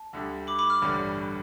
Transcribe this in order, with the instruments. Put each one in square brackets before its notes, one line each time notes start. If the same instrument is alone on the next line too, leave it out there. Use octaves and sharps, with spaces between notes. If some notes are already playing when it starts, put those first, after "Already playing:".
Already playing: [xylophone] A5
[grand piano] D2 D3 G3
[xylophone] B5 D6
B5 D6
D6 F6
[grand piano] A1 G2 D3 G3